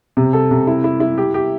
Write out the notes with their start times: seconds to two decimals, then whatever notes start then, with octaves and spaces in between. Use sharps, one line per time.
0.17 C3
0.33 A4
0.51 C3
0.67 E4
0.84 E4
1.00 E4
1.18 G4
1.34 G4